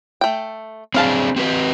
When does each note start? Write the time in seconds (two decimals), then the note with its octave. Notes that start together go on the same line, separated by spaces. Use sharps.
0.21 A3 G5
0.94 C4 D4 G#4 C5 F5 A5
1.36 C4 G4 B4